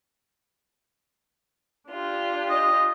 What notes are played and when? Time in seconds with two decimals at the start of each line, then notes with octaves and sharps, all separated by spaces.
1.89 D4 F4 G4
2.50 D#5